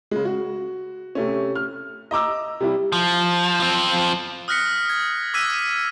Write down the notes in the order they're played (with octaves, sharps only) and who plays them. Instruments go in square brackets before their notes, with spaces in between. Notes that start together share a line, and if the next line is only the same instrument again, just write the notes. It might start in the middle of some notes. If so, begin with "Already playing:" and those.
[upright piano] C#3 G#3
F#4
C3 A3 C#4
F6
D#5 A#5 D6 E6
C3 G3 E4
[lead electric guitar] F3
F3 C4
[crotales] D#6 F6 F#6 A#6 B6 C#7
G#6
D6 E6 F#6 G#6 B6 D#7